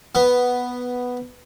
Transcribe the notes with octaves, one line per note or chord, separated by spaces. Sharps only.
B3